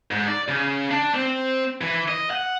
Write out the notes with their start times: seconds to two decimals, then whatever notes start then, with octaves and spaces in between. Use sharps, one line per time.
0.11 G#2
0.28 D5
0.48 C#3
0.91 D4
1.14 C4
1.81 E3
2.08 D#5
2.31 F#5